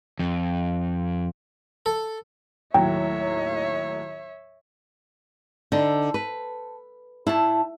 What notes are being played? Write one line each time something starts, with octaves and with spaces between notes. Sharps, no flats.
F2
A4
D#2 A2 F#3 C#5 E5 G5
D3 D#4 A4 C5
B4
A2 E4 A5